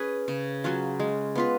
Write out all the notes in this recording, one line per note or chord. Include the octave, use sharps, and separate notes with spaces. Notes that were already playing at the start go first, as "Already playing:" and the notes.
Already playing: C#4 G#4 B4
C#3
F#3 C#4 F4
G#3
B3 F4 B4